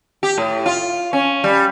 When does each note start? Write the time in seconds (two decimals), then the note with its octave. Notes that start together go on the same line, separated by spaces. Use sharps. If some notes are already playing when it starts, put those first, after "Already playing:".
0.23 G4
0.38 A2
0.66 F4
1.13 C#4
1.44 G3